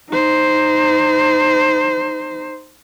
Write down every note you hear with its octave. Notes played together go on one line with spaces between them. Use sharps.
D#4 C5